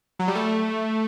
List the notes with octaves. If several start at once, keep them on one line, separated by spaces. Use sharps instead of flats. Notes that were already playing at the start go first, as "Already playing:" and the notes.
F#3
G3
A3